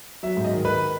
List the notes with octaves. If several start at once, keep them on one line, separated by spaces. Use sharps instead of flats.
F#3 E5
G#2
D#5
D#3
D#3 B4